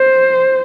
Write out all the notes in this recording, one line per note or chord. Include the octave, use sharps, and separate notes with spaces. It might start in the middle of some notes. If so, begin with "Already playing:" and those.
Already playing: C5